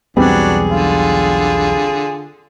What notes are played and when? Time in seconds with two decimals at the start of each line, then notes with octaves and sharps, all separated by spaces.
0.17 B1 E2 F#3 G3 B3 C4 D4 G#4
0.71 D3 F4